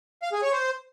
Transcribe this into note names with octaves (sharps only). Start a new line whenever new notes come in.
F5
G#4
C#5
C5